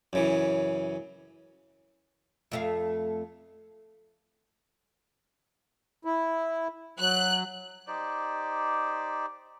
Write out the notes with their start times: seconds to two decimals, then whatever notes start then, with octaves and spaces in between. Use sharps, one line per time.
0.13 F#2 C#3 E3
2.52 F2 A3 F5
6.05 E4
6.99 F#3 F#6
7.87 D#4 G4 C5 D5